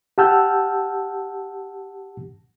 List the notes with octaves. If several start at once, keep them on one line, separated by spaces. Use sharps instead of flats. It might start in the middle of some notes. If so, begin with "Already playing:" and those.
G4 F#5 A5 E6 F6 G6